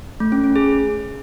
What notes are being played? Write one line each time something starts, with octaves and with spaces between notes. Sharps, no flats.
A3
C#4
C#4
G#4